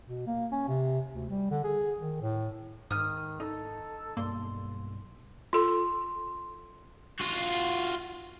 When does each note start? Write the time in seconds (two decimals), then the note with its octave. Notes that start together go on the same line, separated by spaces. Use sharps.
0.07 B2
0.27 A#3
0.52 C#4
0.68 C3
1.14 D2
1.30 G3
1.51 D3
1.64 G#4
2.00 D#3
2.21 A2
2.91 G#2 D#3 D#6 F6
3.40 D#4 A4
4.17 B1 G2 A#3 C6
5.53 F4 A4 C6
7.20 F4 F#4